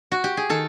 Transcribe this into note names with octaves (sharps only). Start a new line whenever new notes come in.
F#4
G4
G#4
D#3 A4